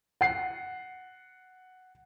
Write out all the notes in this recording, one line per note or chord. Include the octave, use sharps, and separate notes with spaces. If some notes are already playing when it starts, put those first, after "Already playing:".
F#5 C7